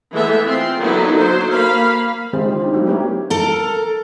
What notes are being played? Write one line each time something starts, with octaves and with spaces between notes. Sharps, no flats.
E3 G#3 A3 B3 E5
C4 F4 C6
D3 F#3 A#3 B3 D#4 E4
F#3 C5
A#3 F5 B5
D3 D#3 G#3 C4 G4 G#4
F4 G4
D4 D#4
F#3 G#3 A3 F#4 G4
B3 D4 E4 G4 A#4 C#5
A4 A#4